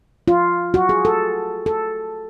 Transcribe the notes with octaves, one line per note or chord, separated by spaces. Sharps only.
F4
F#4
G#4
A4
A4